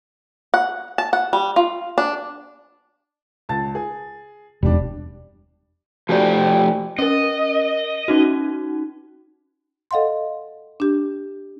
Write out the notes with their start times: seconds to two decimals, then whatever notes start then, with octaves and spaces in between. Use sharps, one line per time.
0.54 F#5
0.98 A5
1.13 F#5
1.33 G3
1.56 F4
1.98 D4
3.49 C#2 A5 A6
3.75 G#4
4.63 E1 G3 D4
6.09 F3 A3 F#4 G4 D5
6.99 C#4 A#4 D#5
8.08 C#4 D#4 F#4
9.91 A4 D#5 F5 F#5 C6
10.80 D4 G4